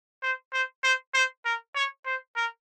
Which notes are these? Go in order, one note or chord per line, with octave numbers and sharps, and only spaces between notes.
C5
C5
C5
C5
A#4
C#5
C5
A#4